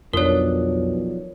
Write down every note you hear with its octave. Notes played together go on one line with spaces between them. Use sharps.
B1 F2 F3 D4 A#4 C#5